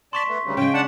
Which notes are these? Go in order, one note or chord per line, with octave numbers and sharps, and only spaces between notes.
D5 A5 C6 C#6 B6
A3 B3
D2 G2 C#3
C#3 G#3 G5
D4 F#5 A5